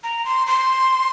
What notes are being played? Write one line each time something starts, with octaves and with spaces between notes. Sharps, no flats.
A#5
C6
C6